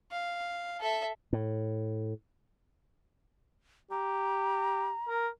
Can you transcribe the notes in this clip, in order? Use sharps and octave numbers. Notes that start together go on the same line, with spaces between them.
F5
A4 E5
A2
G4 A#5
A#4